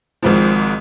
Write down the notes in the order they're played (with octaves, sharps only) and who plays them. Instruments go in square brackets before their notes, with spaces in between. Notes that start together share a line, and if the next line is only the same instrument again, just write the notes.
[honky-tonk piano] G#1 G#2 F3